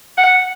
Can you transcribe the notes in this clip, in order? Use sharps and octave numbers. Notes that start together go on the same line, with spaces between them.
F#5